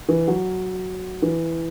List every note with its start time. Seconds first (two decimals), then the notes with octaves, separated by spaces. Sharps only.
0.09 E3
0.28 F#3
1.22 E3